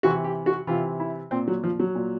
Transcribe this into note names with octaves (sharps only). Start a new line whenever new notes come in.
C3 E3 F#4
G4
F#4
C3 E3 F4
E4
A#2 C4
F#3
F3
F#3
A#2